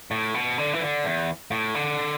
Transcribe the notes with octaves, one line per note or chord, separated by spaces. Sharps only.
A2
B2
D3
E3
D3
E2
A2
D3